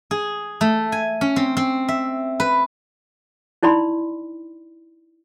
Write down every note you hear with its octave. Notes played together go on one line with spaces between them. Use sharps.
G#4
A3
G#5
C#4
C4
C4
E5
B4
D#4 E4 D5 B5 C6